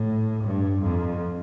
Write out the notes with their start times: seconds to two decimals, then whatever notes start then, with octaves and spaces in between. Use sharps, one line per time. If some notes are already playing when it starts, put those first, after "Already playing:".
Already playing: A2
0.44 G2
0.82 F2